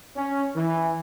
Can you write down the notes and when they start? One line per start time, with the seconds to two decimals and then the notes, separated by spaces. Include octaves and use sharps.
0.16 C#4
0.55 E3